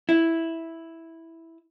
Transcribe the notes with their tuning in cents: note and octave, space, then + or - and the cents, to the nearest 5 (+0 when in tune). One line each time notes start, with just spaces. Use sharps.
E4 -5